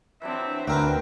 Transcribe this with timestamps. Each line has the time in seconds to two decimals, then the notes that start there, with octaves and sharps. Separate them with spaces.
0.22 E3 F#3 C4 D4 E5
0.68 D2 F#4 A#4 B4 G5